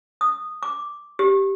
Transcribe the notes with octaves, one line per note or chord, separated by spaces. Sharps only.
D#6
D6
G4